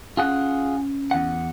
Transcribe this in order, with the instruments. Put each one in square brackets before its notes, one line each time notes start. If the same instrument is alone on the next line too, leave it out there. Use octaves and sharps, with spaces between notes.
[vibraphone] C#4 [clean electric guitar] F4 G#4 F#5
[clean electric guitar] E2 F#5